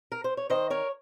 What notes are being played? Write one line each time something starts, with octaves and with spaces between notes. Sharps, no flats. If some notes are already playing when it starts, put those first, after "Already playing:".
A#4
C5
C#5
D#3 C5 D#5
A#4 C#5